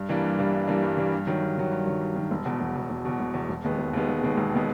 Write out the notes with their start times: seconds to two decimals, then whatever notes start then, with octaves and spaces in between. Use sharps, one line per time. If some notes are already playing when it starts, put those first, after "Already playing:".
Already playing: G2
0.09 E3 G3 A#3 D4
0.24 G2
0.39 E3 G3 A#3 D4
0.53 G2
0.67 E3 G3 A#3 D4
0.83 G2
0.97 E3 G3 A#3 D4
1.12 G2
1.27 D#3 F#3
1.42 G2
1.57 D#3 F#3
1.72 G2
1.86 D#3 F#3
2.01 G2
2.16 D#3 F#3
2.31 E1
2.45 E2 B2
2.61 E1
2.75 E2 B2
2.90 E1
3.05 E2 B2
3.20 E1
3.34 E2 B2
3.49 E1
3.64 D#2 D#3 G#3 B3
3.79 E1
3.93 D#2 D#3 G#3 B3
4.09 E1
4.23 D#2 D#3 G#3 B3
4.37 E1
4.55 D#3 G#3 B3